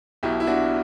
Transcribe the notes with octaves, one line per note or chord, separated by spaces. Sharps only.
B1 B2 E4 G4
E4
D4 F#4